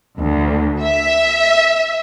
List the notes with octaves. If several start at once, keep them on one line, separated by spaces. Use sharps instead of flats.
D2
E5